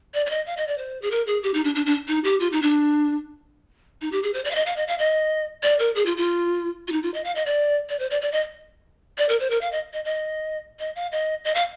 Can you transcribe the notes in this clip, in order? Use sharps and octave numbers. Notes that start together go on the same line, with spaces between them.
D5
D5
D#5
F5
D#5
D5
C5
G#4
A#4
G#4
G4
D#4
D4
D4
D4
D#4
G4
F4
D#4
D4
D#4
G4
G#4
C5
D5
F5
D#5
F5
D#5
F5
D#5
D5
A#4
G#4
F4
F4
F4
D#4
F4
D#5
F5
D#5
D5
D5
C5
D5
D5
D#5
D5
A#4
C5
A#4
F5
D#5
D#5
D#5
D#5
F5
D#5
D#5
F5